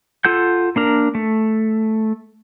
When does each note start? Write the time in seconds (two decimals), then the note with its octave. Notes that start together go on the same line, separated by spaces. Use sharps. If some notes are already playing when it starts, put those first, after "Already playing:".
0.25 F4 A4 F#5 G6
0.76 A#3 D4 A#4
1.15 A3